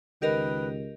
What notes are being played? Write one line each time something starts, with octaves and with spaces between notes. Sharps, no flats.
C#2 D#3 G4 A#4 B4 D#5